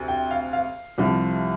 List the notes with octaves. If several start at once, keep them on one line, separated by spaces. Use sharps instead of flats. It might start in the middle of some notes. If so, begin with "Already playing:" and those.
Already playing: D2 C3
G5
F5
F5
C2 C3 F3